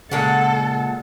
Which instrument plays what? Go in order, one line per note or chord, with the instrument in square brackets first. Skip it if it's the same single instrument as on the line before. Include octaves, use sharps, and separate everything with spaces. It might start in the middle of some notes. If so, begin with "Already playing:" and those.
[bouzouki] A#2 G#3 F#5 [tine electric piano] C#3 [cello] A4